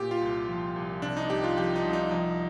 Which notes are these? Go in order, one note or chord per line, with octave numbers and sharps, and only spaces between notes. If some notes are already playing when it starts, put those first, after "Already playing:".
Already playing: A#2 G4
F4
C2
F3
C2
C3 D4
D#4
C2 G4
F4
F3 G4
D#4
C2
D#4
F3 D#4